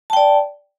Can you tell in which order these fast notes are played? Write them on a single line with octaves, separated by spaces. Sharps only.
A5 G5 D5